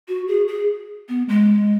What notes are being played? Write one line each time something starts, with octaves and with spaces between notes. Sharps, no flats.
F#4
G#4
G#4
B3
G#3